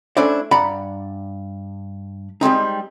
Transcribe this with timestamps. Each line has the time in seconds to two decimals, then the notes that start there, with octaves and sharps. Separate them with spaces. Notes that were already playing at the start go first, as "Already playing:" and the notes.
0.17 A3 C#4 D4 E4 C5 D5
0.51 G2 D5 F#5 A#5 B5
2.41 G3 G#3 C4 D#4